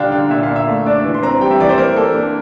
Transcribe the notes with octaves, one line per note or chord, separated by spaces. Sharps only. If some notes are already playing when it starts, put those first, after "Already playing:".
Already playing: A#2 D3 G3 D4 F5 G5 A#5
D3 F5
A#2 E5
F5
A#2
E5
A3
D4 D5
E3
C6
C4 A#5
G3 G5
E5
E3 D5
C5
A#3 A#4
A#3 A4
D4